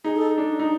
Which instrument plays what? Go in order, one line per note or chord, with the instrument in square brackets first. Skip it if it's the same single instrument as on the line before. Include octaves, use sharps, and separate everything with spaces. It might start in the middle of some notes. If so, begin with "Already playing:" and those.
[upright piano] D#4 [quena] G#4
[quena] A4
[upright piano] D4
D#4